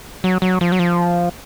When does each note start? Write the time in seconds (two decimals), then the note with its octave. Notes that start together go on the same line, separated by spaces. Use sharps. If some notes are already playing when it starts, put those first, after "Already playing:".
0.24 F#3
0.42 F#3
0.61 F3
0.72 F#3
0.79 F3